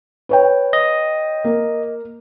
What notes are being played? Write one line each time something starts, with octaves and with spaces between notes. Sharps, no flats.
B4 C#5 G5
D#5
A#3